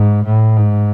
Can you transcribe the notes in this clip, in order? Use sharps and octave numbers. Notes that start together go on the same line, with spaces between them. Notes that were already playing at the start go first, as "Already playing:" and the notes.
Already playing: G#2
A2
G#2